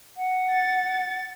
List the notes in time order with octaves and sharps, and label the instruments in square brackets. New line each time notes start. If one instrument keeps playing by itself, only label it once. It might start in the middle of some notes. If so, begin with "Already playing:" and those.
[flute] F#5
[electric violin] A6